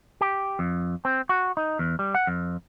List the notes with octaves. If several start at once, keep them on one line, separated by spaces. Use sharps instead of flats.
G4
F2
C4
F#4
D#4
E2
G3
F#5
F2